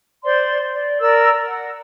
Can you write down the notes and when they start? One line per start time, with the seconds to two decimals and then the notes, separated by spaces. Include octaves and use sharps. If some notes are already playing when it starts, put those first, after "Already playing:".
0.24 C5 D5 C6
0.75 D5
1.01 A#4 D5 E6
1.46 F#5